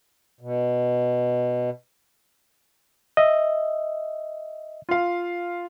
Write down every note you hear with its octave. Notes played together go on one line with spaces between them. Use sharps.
B2
D#5 E5
F4 F5